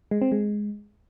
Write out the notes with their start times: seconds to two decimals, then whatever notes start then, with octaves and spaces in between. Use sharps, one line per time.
0.11 G#3
0.22 C4
0.32 G#3